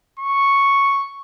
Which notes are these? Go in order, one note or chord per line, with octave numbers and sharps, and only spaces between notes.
C#6